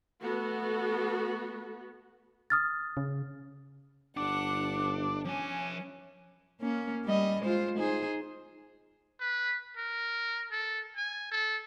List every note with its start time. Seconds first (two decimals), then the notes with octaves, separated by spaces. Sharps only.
0.22 A3 B3 F#4 A4
2.50 D#6 F6 A6
2.97 C#3
4.17 G1 D4 F#5 D6
5.25 F3 C#4 G#5
6.61 A#3 C#4
7.05 G3 D#5
7.42 G#3 F4 C5
7.77 D#4 G#4 C5
9.20 B4
9.77 A#4
10.51 A4
10.96 G#5
11.31 A4